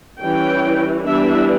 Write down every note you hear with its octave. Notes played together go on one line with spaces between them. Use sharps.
E3 G3 C#4 G5
E3 G3 B3 D4 E5